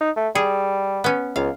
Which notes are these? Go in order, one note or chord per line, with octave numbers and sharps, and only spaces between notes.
D#4
A3
G3 G#4
B3 C#4
C#2 F5